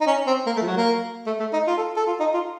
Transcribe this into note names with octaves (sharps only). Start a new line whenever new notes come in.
D#4
C#4
C4
A#3
A3
F3
F#3
A#3
A3
A3
D#4
F4
A4
A4
F4
D#4
F4